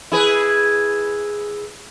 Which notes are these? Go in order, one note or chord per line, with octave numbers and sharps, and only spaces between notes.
E4 G#4 B4